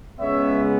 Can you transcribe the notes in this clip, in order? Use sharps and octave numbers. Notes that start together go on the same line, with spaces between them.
C#2 C#3 G#3 B3 C#5 E5